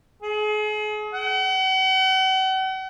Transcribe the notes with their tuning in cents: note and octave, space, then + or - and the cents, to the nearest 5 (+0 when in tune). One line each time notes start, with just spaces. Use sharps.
G#4 +35
F#5 +40